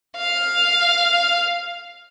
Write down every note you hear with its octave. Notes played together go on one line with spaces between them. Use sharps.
F5